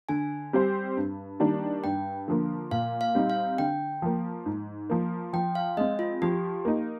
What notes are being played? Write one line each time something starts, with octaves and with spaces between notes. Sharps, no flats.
D3 G#5
G3 C4 G4 C5
G2
D#3 G3 A#3 D4
G2 G5
D3 F3 A#3
A#2 F5
F5
G3 C4 D#4
F5
D3 G5
F3 A#3
G#2
F3 A#3
F3 G5
F5
G#3 C4 D#5
F4
F3 G4
A#3 D#4